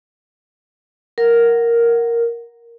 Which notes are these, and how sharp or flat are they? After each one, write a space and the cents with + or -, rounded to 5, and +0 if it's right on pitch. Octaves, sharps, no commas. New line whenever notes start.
A#4 +0 F#5 +0